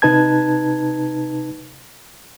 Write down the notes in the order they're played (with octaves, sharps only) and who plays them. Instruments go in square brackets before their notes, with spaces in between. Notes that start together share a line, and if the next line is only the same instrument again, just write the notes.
[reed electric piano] C3 D#4 B4 A5 G#6